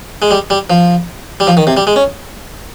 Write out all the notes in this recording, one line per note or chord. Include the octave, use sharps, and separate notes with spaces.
G#3
G3
G3
F3
G3
F3
D#3
C3
G3
G#3
C#4